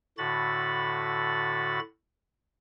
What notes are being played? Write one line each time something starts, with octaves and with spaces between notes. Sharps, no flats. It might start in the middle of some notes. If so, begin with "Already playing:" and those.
A2 D3 F#4 B5 A6